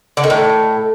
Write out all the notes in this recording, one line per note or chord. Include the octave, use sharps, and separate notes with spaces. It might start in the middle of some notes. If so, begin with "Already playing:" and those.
D3
D#3
A2